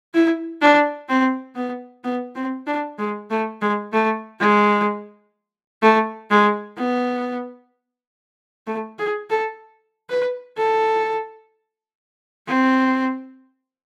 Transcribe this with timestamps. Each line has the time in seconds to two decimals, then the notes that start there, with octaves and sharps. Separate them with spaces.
0.14 E4
0.62 D4
1.09 C4
1.56 B3
2.04 B3
2.36 C4
2.67 D4
2.99 G#3
3.30 A3
3.62 G#3
3.92 A3
4.40 G#3
5.82 A3
6.31 G#3
6.78 B3
8.67 A3
8.99 G#4
9.30 A4
10.10 B4
10.57 A4
12.47 C4